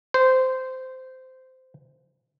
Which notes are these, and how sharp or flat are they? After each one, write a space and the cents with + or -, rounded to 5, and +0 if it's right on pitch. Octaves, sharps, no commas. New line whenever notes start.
C5 -15